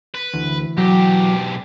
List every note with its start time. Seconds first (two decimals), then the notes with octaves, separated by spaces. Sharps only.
0.14 B4 B6
0.33 D2 E3
0.78 B1 F#3 G4